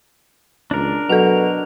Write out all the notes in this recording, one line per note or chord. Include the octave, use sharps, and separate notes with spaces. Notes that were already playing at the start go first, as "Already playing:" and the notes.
C#2 D4 A#4
B2 F#3 A4 F7